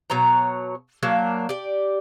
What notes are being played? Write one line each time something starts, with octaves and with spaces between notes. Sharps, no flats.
B2 F#3 C#5 A#5
F#3 A#3 D4
G4 D5